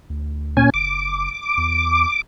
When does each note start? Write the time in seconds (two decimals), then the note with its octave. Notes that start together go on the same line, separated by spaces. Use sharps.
0.10 D2
0.57 A#2 C#4 G#5
0.74 F#1 D6
1.57 E2